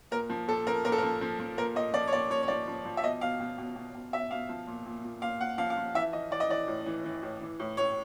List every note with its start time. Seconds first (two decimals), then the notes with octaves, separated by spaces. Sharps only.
0.11 A#2 A#4
0.30 F3
0.47 A#2 A4
0.67 F3 A#4
0.84 A#2 A#4
0.92 A4
0.98 F3 A#4
1.21 F3
1.39 F3
1.57 A#2 A#4
1.75 A#2 D#5
1.93 F3 D5
2.07 C#5
2.13 A#2 D5
2.30 F3 C#5
2.42 C#5
2.48 F3 D5
2.67 F3
2.85 F3
2.97 E5
3.03 B2 D#5
3.21 B2 F5
3.40 B2
3.58 B2
3.76 B2
3.95 B2
4.13 B2 E5
4.31 B2 F5
4.49 F3
4.67 A#2
4.86 A#2
5.04 A#2
5.22 A#2 F5
5.41 A#2 F#5
5.58 F3 F5
5.70 F5
5.77 F3
5.94 E3 E5
6.13 E3 D#5
6.31 E3 D5
6.40 D#5
6.49 E3 D5
6.68 A2
6.86 E3
7.05 E3
7.23 A2
7.41 E3
7.60 A2
7.77 A2 C#5